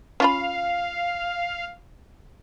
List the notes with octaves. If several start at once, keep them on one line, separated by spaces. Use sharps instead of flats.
C#4 F4 F5 B5